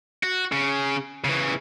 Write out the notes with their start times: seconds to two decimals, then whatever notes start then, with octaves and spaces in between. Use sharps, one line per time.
0.23 F#4
0.52 C#3
1.24 C#3 E3